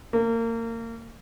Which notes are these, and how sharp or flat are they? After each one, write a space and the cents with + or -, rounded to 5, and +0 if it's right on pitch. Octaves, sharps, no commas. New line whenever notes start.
A#3 -30